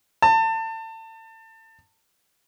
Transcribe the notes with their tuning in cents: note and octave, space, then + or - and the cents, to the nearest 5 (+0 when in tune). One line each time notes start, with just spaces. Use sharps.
A5 +30